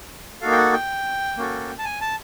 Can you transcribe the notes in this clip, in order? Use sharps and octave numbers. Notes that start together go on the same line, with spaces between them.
A#3 D#4 F#4 A4 F5
G5
F#5
G5
A#3 C#4 F#4 A4
A5
G#5
A5